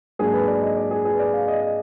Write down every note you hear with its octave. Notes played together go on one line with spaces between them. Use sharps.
G#2 F#3 A#3 D4 G#4
B4
D5
D#5
D5
G#4
G#4
B4
D5
F5
D#5
D#5